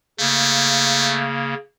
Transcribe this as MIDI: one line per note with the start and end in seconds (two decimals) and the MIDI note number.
0.20 1.54 49
0.20 1.29 57
0.20 1.54 58